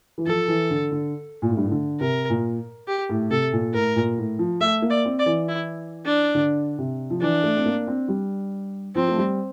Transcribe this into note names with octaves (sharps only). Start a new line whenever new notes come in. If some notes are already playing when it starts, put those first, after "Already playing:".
E3
F3 A4
E3
D3
D3
A#2
A2
G2
A2
D3
C3 A#4
A#2
G4
A2
C3 A4
A#2
A2 A#4
A#2
A2
F3
A3 E5
A#3
D5
C4
D5
E3
E4
D4
D3
C3
F3
E3 D4
A3
C4
A#3
C4
G3
F3 C4
A3
G3